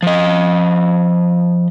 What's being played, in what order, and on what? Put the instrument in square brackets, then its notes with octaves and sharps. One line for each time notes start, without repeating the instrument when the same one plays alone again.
[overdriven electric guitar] F3 D#5